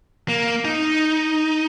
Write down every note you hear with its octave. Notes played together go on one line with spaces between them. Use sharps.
A#3
D#4